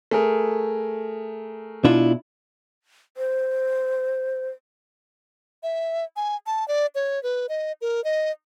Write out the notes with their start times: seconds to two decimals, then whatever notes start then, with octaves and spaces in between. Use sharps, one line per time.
0.11 A3 G#4 A#4
1.85 B2 D4 E4 F4
3.17 C5
5.63 E5
6.16 G#5
6.46 A5
6.68 D5
6.95 C#5
7.23 B4
7.49 D#5
7.81 A#4
8.04 D#5